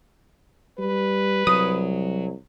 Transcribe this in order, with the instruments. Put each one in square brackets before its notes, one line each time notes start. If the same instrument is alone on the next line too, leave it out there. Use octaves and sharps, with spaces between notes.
[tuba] G3 [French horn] B4
[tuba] C2 [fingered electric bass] F#3 [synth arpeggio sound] D#6